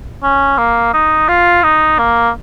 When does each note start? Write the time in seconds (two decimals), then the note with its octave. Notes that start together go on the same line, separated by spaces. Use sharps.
0.23 C#4
0.58 A#3
0.94 D#4
1.28 F4
1.63 D#4
1.98 A#3